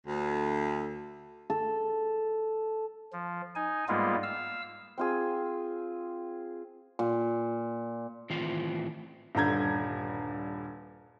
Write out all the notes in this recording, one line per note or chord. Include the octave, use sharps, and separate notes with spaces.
D2
A4
F3
D#4 G#5
G#2 G3 G#3 A#3 B3 F4
F5 E6
C4 F4 G#4
A#2
A2 D#3 E3 C4 E4 F4
D#1 G2 D3 A#5 G6 G#6